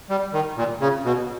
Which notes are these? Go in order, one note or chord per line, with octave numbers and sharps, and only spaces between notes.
G3
D#3
A#2
C#3
B2